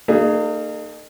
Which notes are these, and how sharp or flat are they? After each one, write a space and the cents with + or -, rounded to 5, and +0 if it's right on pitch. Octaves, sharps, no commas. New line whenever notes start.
A#3 -40 D#4 -45 G#4 +10